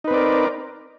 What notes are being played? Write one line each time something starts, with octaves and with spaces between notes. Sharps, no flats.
C4 D#4 A#4 B4 D5